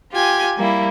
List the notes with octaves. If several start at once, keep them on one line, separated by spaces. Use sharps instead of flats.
F4 G4 G#5
G3 A#3 E4